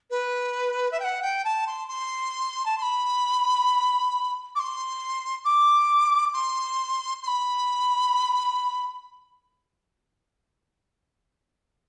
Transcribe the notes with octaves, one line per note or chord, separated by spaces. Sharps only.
B4
E5
G5
F#5
G5
A5
C6
C6
A5
C6
B5
D6
C6
D6
C6
C6
B5